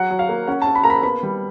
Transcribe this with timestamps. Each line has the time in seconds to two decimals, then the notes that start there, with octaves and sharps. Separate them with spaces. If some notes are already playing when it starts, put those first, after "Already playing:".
Already playing: F#3 F#5
0.10 F#3
0.19 F5
0.29 A#3
0.47 C#4 F#5
0.62 C#4 A5
0.75 B5
0.84 A#3 A#5
0.90 B5
1.03 B3 B5
1.23 G3